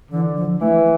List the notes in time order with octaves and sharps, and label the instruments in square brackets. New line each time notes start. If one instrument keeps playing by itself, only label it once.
[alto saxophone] D3 [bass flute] E3
[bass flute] F3
[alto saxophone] E3 [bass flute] A3